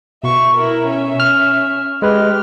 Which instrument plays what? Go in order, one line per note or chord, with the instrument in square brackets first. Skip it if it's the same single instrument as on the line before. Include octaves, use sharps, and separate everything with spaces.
[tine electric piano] B2 [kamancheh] E5 C#6
[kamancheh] E4 A#4
C#4 E5
[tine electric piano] F6
[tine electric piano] G#3 B4 [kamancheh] G4 F6